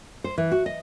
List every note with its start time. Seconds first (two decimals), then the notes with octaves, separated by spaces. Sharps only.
0.24 C5
0.38 E3
0.52 F#4
0.66 D#5